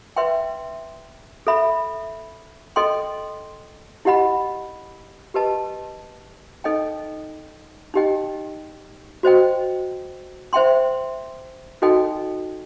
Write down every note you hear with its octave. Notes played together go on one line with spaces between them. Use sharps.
B4 E5 G5 C6
A4 E5 B5
A4 D#5 G5 C6
E4 G4 D#5 F#5 B5
G4 B4 D#5 A5
D#4 A4 D#5 G5
D#4 G4 D#5 G5
F#4 C5 D#5 G5
C5 E5 G5 C6
D#4 F#4 A4 D#5 G5